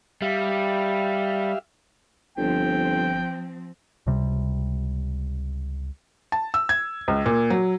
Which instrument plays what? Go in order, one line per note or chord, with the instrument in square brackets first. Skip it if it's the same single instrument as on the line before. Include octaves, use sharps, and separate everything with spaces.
[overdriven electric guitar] G3 [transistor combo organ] G4 E5 F5
[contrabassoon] G1 [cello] F3 C4 [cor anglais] G5
[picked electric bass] C#2 C3 G3
[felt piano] A5
E6
G#6
C#2
A#2
F#3